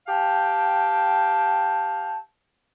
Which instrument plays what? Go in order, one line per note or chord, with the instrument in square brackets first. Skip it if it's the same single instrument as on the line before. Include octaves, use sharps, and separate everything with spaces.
[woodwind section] G4 F5 G5 A5